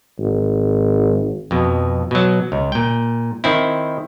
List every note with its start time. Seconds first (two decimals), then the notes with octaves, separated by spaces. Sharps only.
0.19 G#1
1.51 F2 B2
2.11 B2 F#3
2.52 C#2
2.72 A#2 G5
3.44 D#3 C4 E4